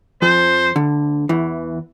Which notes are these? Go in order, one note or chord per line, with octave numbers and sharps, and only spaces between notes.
F2 F3 C5
D2 D3
E2 E3